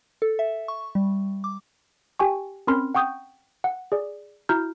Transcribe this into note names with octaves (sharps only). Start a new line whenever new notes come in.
A4
E5
C#6
G3
D6
G4 G5 G#5 C#6
C4 C#4 A#4 B5 C6 F6
F#5 G5 C#6 D#6 G6
F#5
G#4 D5
E4 F#4 A#5 F6 G6